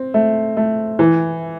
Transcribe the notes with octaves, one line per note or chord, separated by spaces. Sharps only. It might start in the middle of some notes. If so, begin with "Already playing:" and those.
Already playing: C4
A3
A3
E3